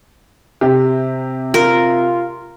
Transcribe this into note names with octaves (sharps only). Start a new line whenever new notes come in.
C3 G4
F4 A#4